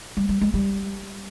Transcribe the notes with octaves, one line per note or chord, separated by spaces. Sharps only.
G3
G3
G#3
G3